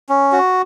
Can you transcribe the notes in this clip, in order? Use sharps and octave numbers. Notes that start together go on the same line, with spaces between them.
C#4
F#4